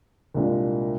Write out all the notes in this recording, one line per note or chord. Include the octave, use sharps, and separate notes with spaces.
C2 A#2 G#3 D4 F4